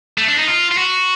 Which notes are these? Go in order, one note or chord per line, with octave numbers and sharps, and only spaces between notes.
A3
D4
D#4
F4
F4
F#4